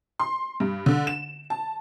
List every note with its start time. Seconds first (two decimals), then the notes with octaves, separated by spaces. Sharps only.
0.20 C6
0.60 G2
0.86 D3
1.07 E7
1.50 A5